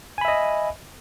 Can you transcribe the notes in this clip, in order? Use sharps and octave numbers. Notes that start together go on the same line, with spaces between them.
D#5 E5 G#5 B5